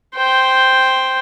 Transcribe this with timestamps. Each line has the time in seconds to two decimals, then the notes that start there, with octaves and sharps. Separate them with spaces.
0.16 C5 G5